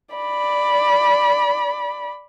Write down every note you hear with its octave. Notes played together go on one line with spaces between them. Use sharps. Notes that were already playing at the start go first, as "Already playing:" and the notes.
D5 B5